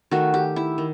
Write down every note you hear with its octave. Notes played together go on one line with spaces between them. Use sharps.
D#3 A3 F#4
G4
E4
D#3